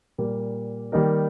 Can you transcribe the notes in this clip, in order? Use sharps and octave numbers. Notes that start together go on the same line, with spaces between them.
A#2 G3 A#3
D#3 G3 A#3 D#4 A#4